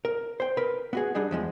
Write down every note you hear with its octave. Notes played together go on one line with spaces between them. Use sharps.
A#4
C5 G5
A#4 B4 B5
B3 F#4 G#4
G3 D4 D#4 G#4
E2 F3 G#3